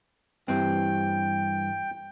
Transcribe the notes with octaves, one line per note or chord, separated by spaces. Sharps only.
G2 E3 C4 G5